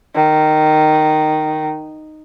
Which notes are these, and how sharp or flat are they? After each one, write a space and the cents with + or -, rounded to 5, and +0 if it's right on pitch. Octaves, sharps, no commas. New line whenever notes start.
D#3 -10